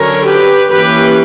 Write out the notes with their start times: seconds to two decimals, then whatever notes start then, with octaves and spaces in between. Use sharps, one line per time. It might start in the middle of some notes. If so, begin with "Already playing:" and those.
Already playing: D3 F#3 C#4 A#4 C#5
0.24 G4 B4
0.70 E3 A#3 C#4 G4 B4